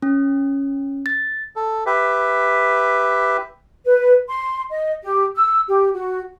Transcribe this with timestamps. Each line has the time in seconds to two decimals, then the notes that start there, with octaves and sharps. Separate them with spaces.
0.02 C#4
1.06 A6
1.56 A4
1.86 G4 B4 E5
3.85 B4
4.29 C6
4.70 D#5
5.03 G4
5.35 E6
5.68 G4
5.93 F#4